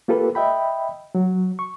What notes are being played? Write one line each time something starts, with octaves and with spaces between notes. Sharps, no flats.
A#3 F4 G4 A4 B4
D#5 E5 G5 B5
F#3
C#6